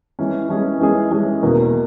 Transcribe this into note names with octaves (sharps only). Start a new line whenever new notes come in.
E3 G#3 C#4 G#4
E3 G#3 C#4 G#4
E3 G#3 C#4 G#4
E3 G#3 C#4 G#4
E2 B2 A#3